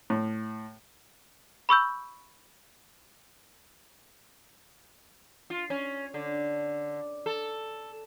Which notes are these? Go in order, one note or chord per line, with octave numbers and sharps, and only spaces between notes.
A2
B5 C#6 E6 G6
F4
C#4
D3
A4